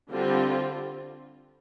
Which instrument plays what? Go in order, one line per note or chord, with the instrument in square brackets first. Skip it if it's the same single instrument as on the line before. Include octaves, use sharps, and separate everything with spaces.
[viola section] D3 G3 C4 F4